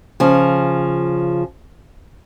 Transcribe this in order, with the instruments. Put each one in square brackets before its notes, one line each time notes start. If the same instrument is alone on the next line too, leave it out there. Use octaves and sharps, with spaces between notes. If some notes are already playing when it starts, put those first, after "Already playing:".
[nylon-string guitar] C#3 F3